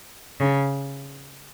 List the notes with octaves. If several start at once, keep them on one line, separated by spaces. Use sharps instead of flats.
C#3